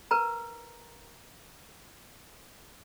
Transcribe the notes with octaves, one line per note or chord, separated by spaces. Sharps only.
A#4 B4 A#5